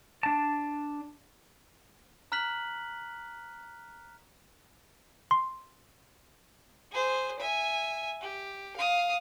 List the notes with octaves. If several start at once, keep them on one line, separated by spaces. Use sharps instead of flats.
D4 A5
A#5 F6 F#6 B6 F#7
C6
G#4 C5
E5 G#5
G4
F5 D#6